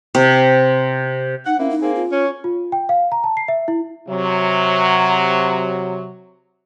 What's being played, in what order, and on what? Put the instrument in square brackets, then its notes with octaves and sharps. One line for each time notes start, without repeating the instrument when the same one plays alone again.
[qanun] C3
[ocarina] D#4 [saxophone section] F#5
[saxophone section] A#3 C4 E4 [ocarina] C#4
[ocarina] D#4
[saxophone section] A#3 C4 G#4
[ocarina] F4
[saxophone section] C#4
[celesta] F4
G5
F5
A#5
A5
C7
E5
E4
[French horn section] C3 F#3